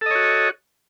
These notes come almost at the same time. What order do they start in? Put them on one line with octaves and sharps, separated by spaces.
A4 D#5 C#5 F#4